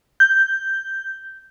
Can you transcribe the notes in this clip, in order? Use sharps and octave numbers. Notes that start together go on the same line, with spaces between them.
G6